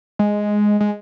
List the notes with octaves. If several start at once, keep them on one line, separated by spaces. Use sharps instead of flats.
G#3
G#3